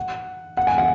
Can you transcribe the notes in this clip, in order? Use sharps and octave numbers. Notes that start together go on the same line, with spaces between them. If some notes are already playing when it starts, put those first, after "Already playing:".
Already playing: F#5
F#5
G#5
F#5